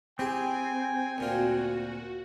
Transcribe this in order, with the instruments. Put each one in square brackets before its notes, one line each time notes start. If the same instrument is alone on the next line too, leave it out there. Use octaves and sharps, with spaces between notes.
[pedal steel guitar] C4 [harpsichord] E4 G4 G#4 [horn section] G5 G#5
[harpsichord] D2 A#2 F4 [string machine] F#4